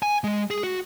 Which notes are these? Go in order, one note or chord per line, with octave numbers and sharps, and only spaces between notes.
G#5
G#3
G#4
F#4